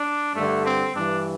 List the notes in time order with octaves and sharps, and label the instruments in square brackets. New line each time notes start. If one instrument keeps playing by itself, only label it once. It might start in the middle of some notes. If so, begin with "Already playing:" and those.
Already playing: [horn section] D4
G2 D3 A3
C4
G2 E3 D4